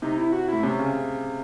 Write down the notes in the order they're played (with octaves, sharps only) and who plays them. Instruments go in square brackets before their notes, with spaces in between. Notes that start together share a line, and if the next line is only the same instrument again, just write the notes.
[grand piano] C3 [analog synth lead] D#4
[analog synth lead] E4
F#4
[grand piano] A2 [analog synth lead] E4
[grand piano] C3 [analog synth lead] C#4
[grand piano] C#3